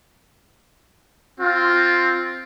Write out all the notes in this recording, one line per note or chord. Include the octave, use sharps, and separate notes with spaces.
C4 F4